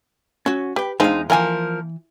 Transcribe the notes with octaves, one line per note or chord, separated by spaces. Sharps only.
F#3 C#4 F#4
G4 B4 G5
E2 F3 G#3 C4 D#4 G#4 F5
E3 F3 A#3 A#4 G5 G#5